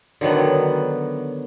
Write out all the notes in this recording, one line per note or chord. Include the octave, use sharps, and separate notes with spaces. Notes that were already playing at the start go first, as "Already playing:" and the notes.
D3 D#3 F#3 B3